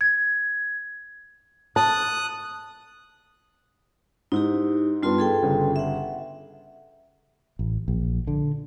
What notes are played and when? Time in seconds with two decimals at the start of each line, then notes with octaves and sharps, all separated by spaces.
0.01 G#6
1.76 A5 D#6 F#6
4.32 G#2 D#4 E4 G4
5.03 G2 G3 B3 D4 F4 C6
5.18 G#4 A4 G5
5.43 G1 C#3
5.76 E5 F#5
7.59 A1
7.88 A#1
8.27 D3